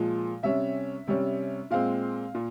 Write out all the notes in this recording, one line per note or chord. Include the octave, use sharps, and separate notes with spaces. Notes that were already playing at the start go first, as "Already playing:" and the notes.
Already playing: A#2 F3 G#3
C3 G3 C#4 E5
C3 G3 C#4
A#2 G#3 C4 F5
A#2